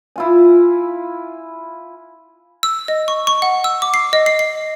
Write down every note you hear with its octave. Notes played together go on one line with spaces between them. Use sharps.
E4 F4 G#5
E6
D#5
C#6
C#6
F#5
E6
D6
C7
D#5
C7
C7